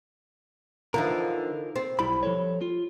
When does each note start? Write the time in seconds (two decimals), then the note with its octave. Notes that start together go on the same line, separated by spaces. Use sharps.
0.94 D3 E3 F3 D#4 F4 A#4
1.76 C4
1.99 B1 G3 E4 B5
2.23 F3 A4 C#5
2.61 F4